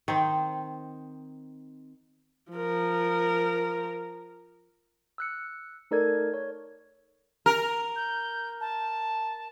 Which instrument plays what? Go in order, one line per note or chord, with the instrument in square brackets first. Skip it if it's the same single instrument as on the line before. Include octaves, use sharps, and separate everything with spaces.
[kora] D#3 C4
[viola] F3 A#4
[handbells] E6 F#6 C#7
A3 D#4 A4 A#4 D5 G#6
C#5
[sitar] A#4
[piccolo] G6
A5